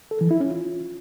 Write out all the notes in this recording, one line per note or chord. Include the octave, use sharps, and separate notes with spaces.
A4
E3
E4
C#4
F4